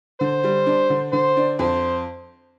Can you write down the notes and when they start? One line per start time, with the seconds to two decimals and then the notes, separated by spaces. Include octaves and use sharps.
0.20 D3 C5
0.44 G3
0.66 D4
0.90 D3
1.13 D3 C5
1.37 D4
1.59 F2 C5